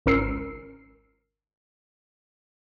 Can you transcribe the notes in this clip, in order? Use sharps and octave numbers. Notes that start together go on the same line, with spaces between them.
G#1 C#2 C#4 A#4 E6 C7